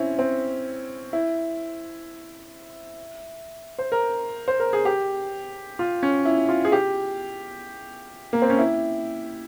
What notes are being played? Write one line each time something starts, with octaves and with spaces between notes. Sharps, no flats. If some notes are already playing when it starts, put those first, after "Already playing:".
Already playing: C4 C#4 E4
C4
E4
C5
A#4
C5
A#4
G#4
G4
F4
C#4
E4
F4
G#4
G4
A#3
C4
C#4
E4